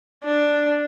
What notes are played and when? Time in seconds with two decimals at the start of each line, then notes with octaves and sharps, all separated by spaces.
0.24 D4